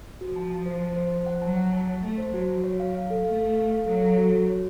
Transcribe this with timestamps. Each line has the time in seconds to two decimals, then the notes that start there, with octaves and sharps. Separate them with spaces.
0.21 F3 F#4
0.36 A5
0.50 A5
0.66 C5
0.82 A5
0.96 C5
1.12 C5
1.26 F#5
1.42 F#3 A5
1.57 F#5
1.73 A5
1.87 A5
2.03 A3 A5
2.18 C5
2.33 F#3 F#4
2.49 F#4
2.64 C#5
2.80 F5
2.95 F5
3.10 A4
3.25 A3 F5
3.41 A4
3.56 F5
3.71 F5
3.86 F#3 A4
4.02 A4
4.17 F#4
4.31 F#4
4.47 C#5